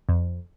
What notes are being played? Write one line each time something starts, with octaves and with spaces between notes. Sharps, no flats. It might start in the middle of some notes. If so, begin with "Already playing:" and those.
F2